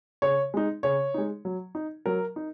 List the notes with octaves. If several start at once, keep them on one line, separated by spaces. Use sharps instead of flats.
C#3 C#5
G#3 D#4
C#3 C#5
G#3 D#4
F#3
D#4
F#3 A#4
D#4